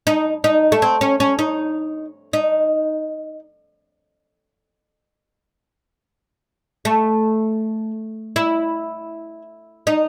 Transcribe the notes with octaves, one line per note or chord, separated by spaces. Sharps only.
D#4
D#4
A3
C4
C#4
C#4
D#4
D#4
A3
E4
D#4